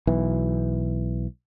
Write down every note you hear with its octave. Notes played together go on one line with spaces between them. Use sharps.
B1 E3